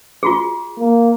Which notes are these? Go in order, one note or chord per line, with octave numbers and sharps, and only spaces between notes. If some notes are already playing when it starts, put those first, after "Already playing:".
F4 F#4 G#4
A#3